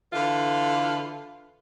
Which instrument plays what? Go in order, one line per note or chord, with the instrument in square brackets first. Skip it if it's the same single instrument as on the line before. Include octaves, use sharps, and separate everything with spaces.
[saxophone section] D3 E3 F4 B4